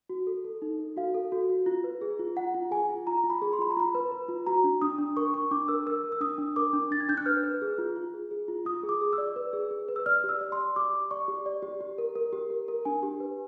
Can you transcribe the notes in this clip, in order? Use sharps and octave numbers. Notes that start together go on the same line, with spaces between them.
F#4
A4
A4
D#4
A4
F#4 F5
A4
F#4
F#4
F4
B4
G#4
F4
F4 F#5
F4
G#4 G#5
F4
F4 A#5
F4
B5
G#4
C6
F4 B5
A#5
F4 B5
B4
B4
F4
F#4 A#5
D4
D4 D#6
D4
A#4 C#6
D4 C#6
D4 D6
A#4 E6
A#4 E6
A#4
E6
D4 D#6
D4
A#4 D6
D4
D4 A6
G#6
D4 G6
F#6
B4 F6
B4
G#4
F4
F4
G#4
G#4
F4
F4 D#6
G#4
D6
G#4
E6
D5
B4
G#4
G#4
B4
E6
D5 F6
G4
E6
D5
C6
D5
G4 D6
G4
D5 C#6
G4
D5
G4
G4
A#4
A#4
G4
A#4
A#4
D4 G#5
G4
B4